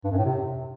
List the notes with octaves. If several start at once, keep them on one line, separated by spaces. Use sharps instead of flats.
G2
F#2
A2
C3